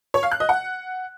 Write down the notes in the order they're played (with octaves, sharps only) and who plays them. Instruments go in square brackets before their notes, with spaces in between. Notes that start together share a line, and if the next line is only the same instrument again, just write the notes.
[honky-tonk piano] C#5
F5
F#6
D#5
F#5